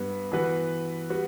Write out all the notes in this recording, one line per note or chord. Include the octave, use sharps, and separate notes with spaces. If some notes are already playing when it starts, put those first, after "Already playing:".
Already playing: G2 B3
E3 B3 F#4 B4
G3 B3 F#4